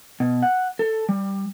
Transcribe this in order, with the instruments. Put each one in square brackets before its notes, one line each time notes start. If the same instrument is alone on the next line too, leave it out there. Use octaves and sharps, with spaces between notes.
[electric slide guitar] B2
F#5
A4
G3